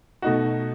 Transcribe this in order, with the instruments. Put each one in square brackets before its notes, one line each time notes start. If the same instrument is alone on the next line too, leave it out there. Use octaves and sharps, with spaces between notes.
[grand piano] B2 A3 D#4 F#4